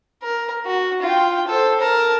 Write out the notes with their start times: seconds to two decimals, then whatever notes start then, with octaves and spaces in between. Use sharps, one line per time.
0.23 A#4
0.66 F#4
1.02 F4 G5
1.47 A4 C5
1.80 A#4 A5